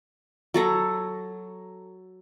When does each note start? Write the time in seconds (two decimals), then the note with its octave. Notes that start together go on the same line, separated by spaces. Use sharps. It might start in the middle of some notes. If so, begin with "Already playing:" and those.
0.54 F#3 A4 A#5